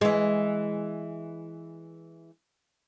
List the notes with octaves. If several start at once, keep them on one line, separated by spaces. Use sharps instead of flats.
E3 G#3